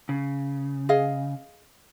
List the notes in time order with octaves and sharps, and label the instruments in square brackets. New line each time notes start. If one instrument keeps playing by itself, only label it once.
[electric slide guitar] C#3
[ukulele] G#4 D#5 F5